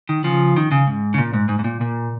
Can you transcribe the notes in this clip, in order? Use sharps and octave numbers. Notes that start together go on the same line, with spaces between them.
D#3
C#3 F3
D#3
C#3
G#2
C#3
A#2
G#2
G#2
G#2
A#2
A#2